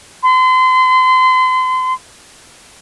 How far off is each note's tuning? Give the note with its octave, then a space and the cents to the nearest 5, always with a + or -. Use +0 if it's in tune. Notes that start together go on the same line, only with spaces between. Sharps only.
C6 -35